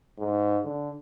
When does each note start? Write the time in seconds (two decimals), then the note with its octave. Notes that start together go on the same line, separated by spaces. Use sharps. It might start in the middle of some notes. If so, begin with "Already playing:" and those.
0.19 G#2
0.65 D3